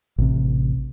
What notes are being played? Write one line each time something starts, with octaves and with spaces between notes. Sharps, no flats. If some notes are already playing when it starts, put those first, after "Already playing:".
A1 C3